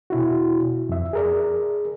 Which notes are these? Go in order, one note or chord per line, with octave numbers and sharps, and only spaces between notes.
B2 E4 F#4
F2 E5
G#4 A#4 D5